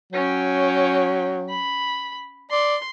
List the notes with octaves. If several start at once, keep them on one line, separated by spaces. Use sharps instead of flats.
F#3 C#4 G5
B5
D5 C6